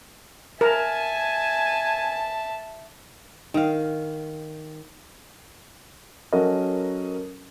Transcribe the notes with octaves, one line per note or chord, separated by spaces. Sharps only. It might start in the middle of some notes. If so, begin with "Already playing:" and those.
A#4 E5 G#5 A5
D#3 F5
F#3 C#4 F#4 A4 A#4 D#5